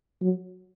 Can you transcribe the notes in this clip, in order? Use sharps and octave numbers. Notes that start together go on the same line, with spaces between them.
F#3